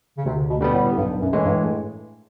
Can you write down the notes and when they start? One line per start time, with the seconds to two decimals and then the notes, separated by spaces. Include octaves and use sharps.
0.17 C#3
0.25 D2 C3
0.49 B2
0.61 D3 G3 B3
0.73 A2
0.97 B1 G2
1.21 F#2
1.33 A2 E3 G#3
1.45 G2